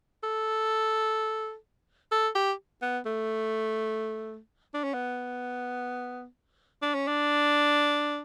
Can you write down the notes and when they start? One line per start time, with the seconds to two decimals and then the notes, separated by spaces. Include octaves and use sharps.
0.24 A4
2.12 A4
2.35 G4
2.82 B3
3.06 A3
4.74 D4
4.84 C#4
4.94 B3
6.82 D4
6.95 C#4
7.08 D4